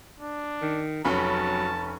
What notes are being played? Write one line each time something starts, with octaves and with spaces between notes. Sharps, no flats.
D4
D#3
F1 F#3 C#4 A5 B5